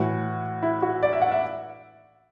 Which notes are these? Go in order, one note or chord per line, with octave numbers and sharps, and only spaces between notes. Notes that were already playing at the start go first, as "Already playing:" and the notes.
Already playing: A2 E3 F#4
E4
F#4
D5
E5
F#5
E5